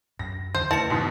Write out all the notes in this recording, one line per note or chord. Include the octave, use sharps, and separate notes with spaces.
F#2 A#6
E2 D3 C5
F2 C#3 A3 E4 B4 A5 C#7
G#2 B2 E3